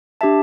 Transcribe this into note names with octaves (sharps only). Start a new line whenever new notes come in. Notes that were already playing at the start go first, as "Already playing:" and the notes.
D4 G4 E5 A5